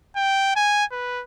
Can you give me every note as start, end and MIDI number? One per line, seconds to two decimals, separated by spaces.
0.16 0.56 79
0.56 0.85 80
0.92 1.22 71